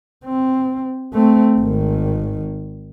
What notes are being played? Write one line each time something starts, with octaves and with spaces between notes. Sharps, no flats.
C4
A3 C4
G#1 D#3